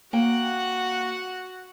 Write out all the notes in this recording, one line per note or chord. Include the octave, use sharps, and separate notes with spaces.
A#3 F#4 F#5 G5